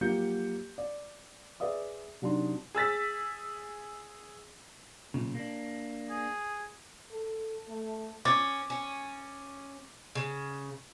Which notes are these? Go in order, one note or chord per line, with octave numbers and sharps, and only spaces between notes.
F3 F#3 A#3 G4 G6 C#7
D5
G#4 B4 D5 E5 D#6
C3 F#3 D4 D#4 C6
G#4 E6 A6 B6
B1 A#2 C#3
A#3 D4
G#4
A4
A3
C#4 D6 A6
C#4
C#3